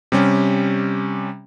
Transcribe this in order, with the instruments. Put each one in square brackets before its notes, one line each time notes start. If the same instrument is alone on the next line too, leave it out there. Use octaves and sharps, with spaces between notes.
[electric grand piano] C3 G3 C#4